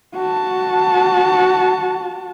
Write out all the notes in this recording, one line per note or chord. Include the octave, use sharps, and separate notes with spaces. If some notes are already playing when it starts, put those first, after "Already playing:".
F#4 A5